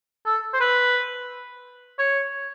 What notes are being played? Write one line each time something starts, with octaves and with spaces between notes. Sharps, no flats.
A4
C5
B4
C#5